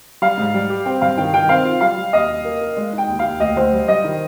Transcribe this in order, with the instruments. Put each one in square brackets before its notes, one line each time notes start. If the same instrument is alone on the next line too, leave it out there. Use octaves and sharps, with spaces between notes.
[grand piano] G3 [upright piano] F5
[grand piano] G#2
G3
G4
[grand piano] C4 [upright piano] G5
[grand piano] G2 [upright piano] F5
[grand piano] D#3 [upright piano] G5
[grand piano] D#3 [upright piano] G5
[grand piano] C4 [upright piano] F5
[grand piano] F4
[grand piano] G3 [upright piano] F5
[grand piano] G3
[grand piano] D#2 [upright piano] D#5
[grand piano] D#2
A#3
A#3
G#3
[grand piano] D#4 [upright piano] G5
[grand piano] D#2
[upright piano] F5
[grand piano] D#2
[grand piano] D2 [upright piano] D#5
[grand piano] D2 [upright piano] C5
[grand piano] G3
[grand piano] G3 [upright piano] D#5
[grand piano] D#3